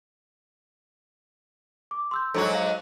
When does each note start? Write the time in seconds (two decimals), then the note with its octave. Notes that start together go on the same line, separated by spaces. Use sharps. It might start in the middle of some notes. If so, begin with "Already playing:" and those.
1.91 D6
2.11 C6 E6 G6
2.34 G#2 F#3 F#4 A4
2.55 F5